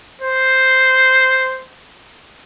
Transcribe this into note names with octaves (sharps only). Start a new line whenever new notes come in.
C5